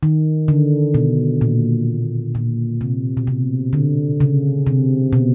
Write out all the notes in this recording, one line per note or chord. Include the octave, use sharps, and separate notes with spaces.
D#3
D3
B2
A#2
A#2
C3
B2
C3
D3
C#3
C3
B2